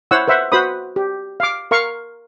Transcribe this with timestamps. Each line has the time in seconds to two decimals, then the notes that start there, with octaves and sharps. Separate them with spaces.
0.11 E4 C5 C#5 F#5 E6
0.28 B4 C5 E5 F#5
0.52 F#4 B4 C5 B5 D#6
0.96 G4
1.40 F5 D6
1.71 A#4 F5 C#6